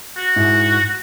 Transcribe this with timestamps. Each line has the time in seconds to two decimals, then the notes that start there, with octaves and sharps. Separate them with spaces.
0.17 F#4
0.36 G#2 E4